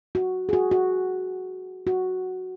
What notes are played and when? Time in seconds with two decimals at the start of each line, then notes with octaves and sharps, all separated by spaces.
0.15 F#4
0.49 G#4
0.53 F#4
0.71 F#4
1.87 F#4